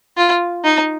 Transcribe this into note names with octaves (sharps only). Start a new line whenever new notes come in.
F4
D#4